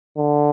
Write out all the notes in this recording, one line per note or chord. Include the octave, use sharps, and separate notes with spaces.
D3